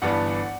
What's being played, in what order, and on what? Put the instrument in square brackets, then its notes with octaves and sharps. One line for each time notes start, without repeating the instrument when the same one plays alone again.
[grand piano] G1 G2 E3 B3 D4 D5 F#5